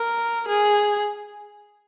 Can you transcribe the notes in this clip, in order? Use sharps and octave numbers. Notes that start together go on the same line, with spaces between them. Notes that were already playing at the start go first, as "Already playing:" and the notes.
Already playing: A#4
G#4